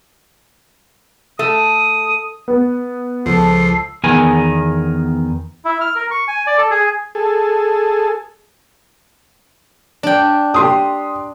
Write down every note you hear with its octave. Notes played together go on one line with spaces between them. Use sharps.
A3 D#6
B3
C#2 F3 A4 C7
E2 D#3 B3 G#4 A#4 G#5
E4
F6
A#4
C#6
G#5
D5
A4
G#4
G#4 A4
D4 G5
G4 C6 D#6